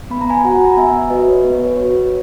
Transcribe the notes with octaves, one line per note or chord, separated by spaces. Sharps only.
B3 B5
A#5
G#5 B5
F#4 F#5 A#5
A#5
B3 E5 G#5
F#4 B4 D#5
C#5
B3 B4
C#5
B4
F#4 C#5